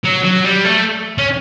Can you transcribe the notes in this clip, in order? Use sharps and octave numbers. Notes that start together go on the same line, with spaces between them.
F#3
F#3
G3
A3
C#4